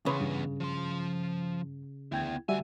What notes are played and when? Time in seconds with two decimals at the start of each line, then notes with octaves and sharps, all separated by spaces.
0.06 E2 C#3 B3 B4 B5 C6
0.20 G2
0.60 F3 C6
2.12 D2 B3 E4 G5 G#6
2.49 D2 G3 F#4 E5 G#5